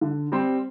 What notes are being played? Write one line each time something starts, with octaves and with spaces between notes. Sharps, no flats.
D3
G3 C4